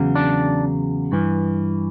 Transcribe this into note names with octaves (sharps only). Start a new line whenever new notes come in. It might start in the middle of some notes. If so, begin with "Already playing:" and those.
Already playing: E2 C#3 F#3
D4
G2 E3